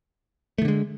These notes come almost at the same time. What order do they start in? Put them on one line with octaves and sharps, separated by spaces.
A3 D#3 D3 G#3